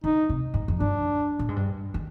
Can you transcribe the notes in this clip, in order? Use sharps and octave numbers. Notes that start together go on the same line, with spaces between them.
D3 D#4
C3
G#2
F2
G2 D4
A#2
G#2
G2
D#3